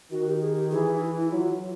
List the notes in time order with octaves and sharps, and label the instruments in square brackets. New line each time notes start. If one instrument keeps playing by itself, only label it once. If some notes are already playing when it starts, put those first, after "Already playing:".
[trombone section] D#3 [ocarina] F#4
[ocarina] G4
G#4
G4
[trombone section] E3 [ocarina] G#4
[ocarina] D#4
E4
E4
[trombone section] F#3 [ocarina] F4